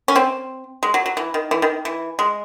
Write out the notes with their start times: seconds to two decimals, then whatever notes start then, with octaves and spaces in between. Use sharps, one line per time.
0.08 C#4
0.16 C4
0.83 G#3
0.94 F#3
1.06 F#3
1.17 E3
1.34 D#3
1.51 E3
1.62 D#3
1.85 E3
2.19 G#3